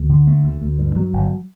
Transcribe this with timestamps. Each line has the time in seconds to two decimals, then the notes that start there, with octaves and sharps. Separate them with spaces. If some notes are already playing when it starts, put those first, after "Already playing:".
Already playing: D2
0.09 D3
0.27 A3
0.44 D2
0.61 D2
0.79 G2
0.96 F#3
1.13 G1